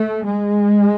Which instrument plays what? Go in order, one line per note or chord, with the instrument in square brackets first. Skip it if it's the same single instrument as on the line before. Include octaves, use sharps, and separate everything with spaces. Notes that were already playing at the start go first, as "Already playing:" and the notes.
Already playing: [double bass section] A3
G#3